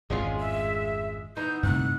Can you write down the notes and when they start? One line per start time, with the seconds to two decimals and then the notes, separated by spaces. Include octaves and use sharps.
0.10 G#1 F2 A2 G#3 C#4 F4
0.40 E5
1.37 E3 B3 D#4 G6
1.63 G2 C3 A3 F#6